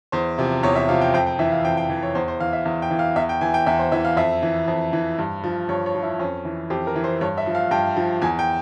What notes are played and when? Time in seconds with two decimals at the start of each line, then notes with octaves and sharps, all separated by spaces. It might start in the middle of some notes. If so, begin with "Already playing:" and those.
0.12 E2 C5
0.38 C3 F3
0.63 E2 C#5
0.76 E5
0.89 C3 F3 F5
1.01 G5
1.14 F2 G5
1.26 G5
1.39 E3 E5
1.52 F5
1.64 F2 G5
1.77 G5
1.90 E3
2.03 C#5
2.15 E2 C5
2.28 C5
2.40 E3 F5
2.53 E5
2.65 E2 F5
2.82 G5
2.91 E3
2.99 F5
3.16 E2 E5
3.29 G5
3.41 E3 G#5
3.54 G5
3.66 E2 E5
3.79 C5
3.92 E3 E5
4.05 F5
4.17 F2 E5
4.43 E3
4.68 F2
4.93 E3
5.19 G2
5.44 F3
5.69 G2 C#5
5.86 C#5
5.95 F3
6.03 E4
6.19 F2 C#4
6.45 E3
6.70 F2 G4
6.87 A#4
6.96 E3
7.04 C5
7.21 G2 C#5
7.38 E5
7.46 F3
7.55 F5
7.71 G2 G5
7.96 F3
8.22 E2 G#5
8.39 G5